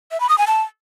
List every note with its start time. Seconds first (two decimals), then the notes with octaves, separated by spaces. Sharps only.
0.11 E5
0.20 B5
0.29 D#6
0.38 G#5
0.47 A5